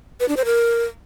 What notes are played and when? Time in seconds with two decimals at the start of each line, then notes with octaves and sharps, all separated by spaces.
0.20 B4
0.28 D4
0.37 C5
0.45 A#4